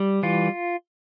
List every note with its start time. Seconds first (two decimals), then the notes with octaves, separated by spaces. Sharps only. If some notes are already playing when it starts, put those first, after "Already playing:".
Already playing: G3
0.23 E3 F4